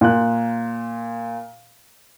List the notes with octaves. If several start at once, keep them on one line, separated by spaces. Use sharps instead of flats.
A#2 F#6